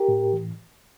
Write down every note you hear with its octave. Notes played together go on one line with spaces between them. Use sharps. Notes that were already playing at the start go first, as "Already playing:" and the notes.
Already playing: G4 A#4
A2
E3